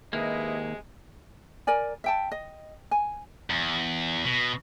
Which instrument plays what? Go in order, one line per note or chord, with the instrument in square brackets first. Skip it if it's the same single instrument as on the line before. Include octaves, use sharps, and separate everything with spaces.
[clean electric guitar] D#2 A#3 [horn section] C3 G#3 [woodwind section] E4 B4 D#5
[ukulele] A#4 D5 G#5
E5 G5 A5
D#5
G#5
[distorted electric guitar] E2
B2